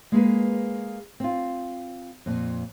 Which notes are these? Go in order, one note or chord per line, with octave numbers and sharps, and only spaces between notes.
G#3 A#3 G#4 B4
C4 F4
F2 A#2